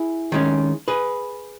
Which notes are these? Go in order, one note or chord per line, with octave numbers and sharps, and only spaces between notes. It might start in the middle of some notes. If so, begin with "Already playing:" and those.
Already playing: E4 G#4
D#3 G#3 C#4
G#4 B4